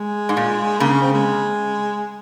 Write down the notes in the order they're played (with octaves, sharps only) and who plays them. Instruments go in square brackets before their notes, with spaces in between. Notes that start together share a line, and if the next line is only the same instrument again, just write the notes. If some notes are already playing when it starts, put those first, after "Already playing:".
Already playing: [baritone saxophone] G#3
[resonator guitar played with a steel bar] G#2
A#2
[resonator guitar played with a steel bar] C#3 [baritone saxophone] A#3
[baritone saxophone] C#4
C4
G#3